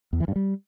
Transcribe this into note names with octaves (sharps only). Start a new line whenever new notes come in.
E2
E3
G2
G3